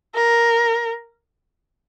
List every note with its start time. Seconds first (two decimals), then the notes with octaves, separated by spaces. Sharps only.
0.15 A#4